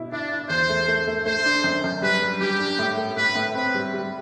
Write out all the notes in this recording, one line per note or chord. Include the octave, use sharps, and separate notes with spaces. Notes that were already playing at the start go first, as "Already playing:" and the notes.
Already playing: B2 E4
D4 E4
E4
E2 C5
A3
A3
A3
A3 C5
D4
F#2
F#2
G3 B4
G3
G3 G4
D4
A2
A3
A2 B4
A2
C4 B4
G3
G3